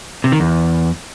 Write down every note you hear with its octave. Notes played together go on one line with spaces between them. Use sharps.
C3
D#3
E2